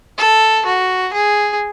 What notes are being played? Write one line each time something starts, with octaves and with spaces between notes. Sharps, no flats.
A4
F#4
G#4